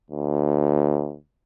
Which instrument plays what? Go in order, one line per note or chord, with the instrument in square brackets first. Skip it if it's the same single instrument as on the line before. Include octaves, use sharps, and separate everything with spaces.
[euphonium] D2